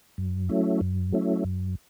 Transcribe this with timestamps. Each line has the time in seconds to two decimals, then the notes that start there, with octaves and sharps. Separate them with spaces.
0.18 F#2
0.49 F#3 A3 C#4 E4
0.81 F#2
1.13 F#3 A3 C#4 E4
1.44 F#2